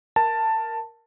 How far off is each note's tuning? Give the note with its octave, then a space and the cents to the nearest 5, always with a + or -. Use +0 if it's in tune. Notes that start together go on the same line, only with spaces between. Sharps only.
A#4 +0 A5 +10